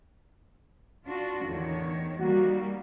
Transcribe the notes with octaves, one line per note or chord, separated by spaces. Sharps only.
D4 F4 F#4
E2 A2 D3 D#3 C#5
D#3 G3 A#3 F#4